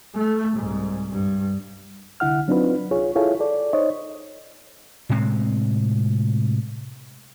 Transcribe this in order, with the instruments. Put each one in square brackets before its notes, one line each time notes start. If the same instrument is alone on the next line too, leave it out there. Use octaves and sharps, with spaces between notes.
[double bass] A3
C2 G#2
G2
[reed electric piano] C2 D3 E4 F#5 F6
F#3 C4 D4 D#4 F4 B4
C2 F4 G#4 C#5
E4 F4 G#4 A4 C#5 F5
A4 D5
D#4 C5 C#5 D#5
[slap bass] A2 C3 G#3 C4